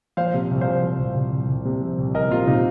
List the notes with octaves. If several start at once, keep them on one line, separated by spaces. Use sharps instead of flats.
F3 C5 F5
C3
C2
C5 F5
F3
F3
C2
C2
C2
C2
C3
F3
C2
C2 A#4 D#5
C3 F4
C3 D#4